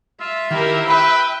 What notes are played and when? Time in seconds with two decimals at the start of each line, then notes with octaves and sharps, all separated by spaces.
0.20 F4 E5
0.51 D#3 A#3 E4 G4 A#4
0.88 B4 G5 B5